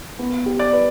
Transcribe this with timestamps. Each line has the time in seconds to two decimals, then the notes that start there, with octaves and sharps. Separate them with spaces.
0.19 B3
0.46 G4
0.59 D5
0.73 B4